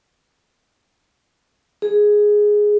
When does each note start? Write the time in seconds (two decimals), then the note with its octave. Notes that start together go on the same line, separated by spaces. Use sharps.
1.82 G#4